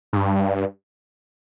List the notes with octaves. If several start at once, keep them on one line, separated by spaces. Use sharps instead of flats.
G#2
G2